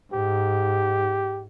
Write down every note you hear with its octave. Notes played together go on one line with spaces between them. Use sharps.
G#2 G4